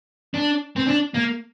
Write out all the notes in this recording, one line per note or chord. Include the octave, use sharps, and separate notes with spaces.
D4
C4
D4
A#3